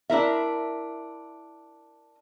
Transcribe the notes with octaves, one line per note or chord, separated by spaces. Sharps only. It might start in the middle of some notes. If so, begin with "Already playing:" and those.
D4 E4 A#4 E5